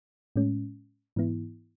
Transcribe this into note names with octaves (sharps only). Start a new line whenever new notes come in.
A2 G#3 C#4
G#2 E3 B3 E4